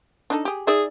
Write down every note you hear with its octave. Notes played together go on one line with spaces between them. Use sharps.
D4 D#4 A4
G4 G#4
D#4 G#4 D5 E5